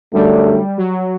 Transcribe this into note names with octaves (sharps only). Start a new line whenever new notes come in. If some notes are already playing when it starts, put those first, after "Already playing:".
F#2 D3 F#3 G3 A3 D4
F#3